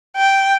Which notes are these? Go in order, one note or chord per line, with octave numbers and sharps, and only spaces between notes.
G5